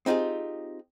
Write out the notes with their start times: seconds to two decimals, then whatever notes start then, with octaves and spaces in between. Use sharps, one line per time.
0.06 C4 D#4 F4 G4 G#4